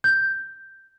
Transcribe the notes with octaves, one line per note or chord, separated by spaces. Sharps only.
G6